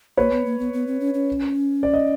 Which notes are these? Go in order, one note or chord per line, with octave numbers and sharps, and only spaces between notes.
A#3 B4 C#5
B3
A#3
B3
B3
C4
C#4
C#4
D5
D#5